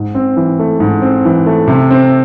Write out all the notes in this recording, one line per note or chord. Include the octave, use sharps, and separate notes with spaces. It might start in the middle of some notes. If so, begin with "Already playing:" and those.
Already playing: G#2
C4
E3
A3
G#2
C4
E3
A3
C3
C4